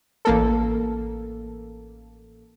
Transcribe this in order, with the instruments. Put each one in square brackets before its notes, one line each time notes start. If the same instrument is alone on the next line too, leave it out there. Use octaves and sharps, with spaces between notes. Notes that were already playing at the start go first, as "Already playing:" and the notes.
[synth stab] A1 A#3 A4